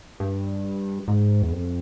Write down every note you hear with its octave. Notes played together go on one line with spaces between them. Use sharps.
G2
G#2
E2
F2